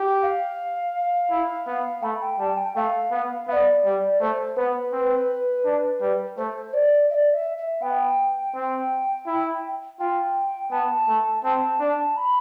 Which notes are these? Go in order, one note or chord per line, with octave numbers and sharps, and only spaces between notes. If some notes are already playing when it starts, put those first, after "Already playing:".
Already playing: G4
F5
E4
B3
A3 B5
G5
G3 A5
G5
A3 F5
B3
B3 D5 E5
G3
A3 C5
B3 B4
C4
D4
G3
A3 C5
D5
E5
D5
E5
E5
B3 G5
C4
E4
F4 G5
B3 A5
A3
C4 A5
D4
B5